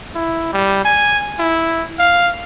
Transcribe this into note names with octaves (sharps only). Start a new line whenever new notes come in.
E4
G3
G#5
E4
F5